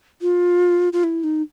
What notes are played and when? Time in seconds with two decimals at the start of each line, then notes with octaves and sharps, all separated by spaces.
0.22 F4
0.93 F4
1.04 E4
1.24 D#4